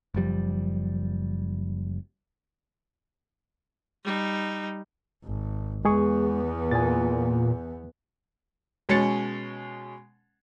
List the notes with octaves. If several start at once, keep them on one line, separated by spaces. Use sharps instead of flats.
F#1 F#2 F3 G3
G3 D#4
G#1
E2 G#3 B3 G#4 C#6
A#2 G#5 A6
B2 G#3 C#4 A6 C#7